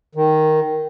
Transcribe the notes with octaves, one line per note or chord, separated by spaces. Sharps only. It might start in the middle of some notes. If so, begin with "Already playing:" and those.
D#3